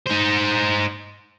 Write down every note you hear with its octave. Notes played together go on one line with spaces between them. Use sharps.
D#4 C5